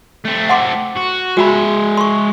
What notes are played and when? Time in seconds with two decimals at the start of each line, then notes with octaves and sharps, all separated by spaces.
0.25 A3 C4
0.49 F#5 C6 D6
0.96 F#4
1.37 G#3 F#4 E5 G5 B5
1.97 C6 C#6